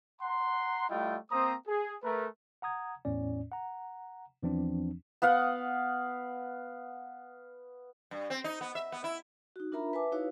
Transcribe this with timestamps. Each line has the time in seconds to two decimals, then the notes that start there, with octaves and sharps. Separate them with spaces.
0.21 F#5 A#5 C6
0.90 G3 A3 E4 F4 D#5 G5
1.31 A#3 C4 C5 A#5 D#6
1.68 G#4
2.04 A3 A#4 B4
2.62 F#5 A#5 D#6 G#6
3.05 E2 A2 C#4 D5
3.52 F#5 A#5
4.42 E2 E3 F3 C4 D4
5.22 B3 B4 F5 F#5
8.11 G2
8.30 C4
8.44 D#4
8.61 B3
8.75 E5
8.92 B3
9.04 E4
9.56 D#4 F#4
9.72 D4 F4 A#4 E5 A#5 B5
9.93 B4 E5 G#5 A5 D6
10.12 D#4 E4 F#4 B4 C#5 F5